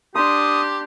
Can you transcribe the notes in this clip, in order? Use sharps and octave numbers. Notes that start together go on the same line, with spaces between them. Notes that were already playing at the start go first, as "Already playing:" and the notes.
D4 G4 C6 D#6